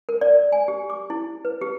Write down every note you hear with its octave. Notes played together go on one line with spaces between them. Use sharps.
A#4
D5
G#5
G4
D6
E4
B4
G4